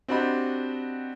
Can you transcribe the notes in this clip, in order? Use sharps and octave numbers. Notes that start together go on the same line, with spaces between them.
C4 D4 F#4 G4 D#5 B5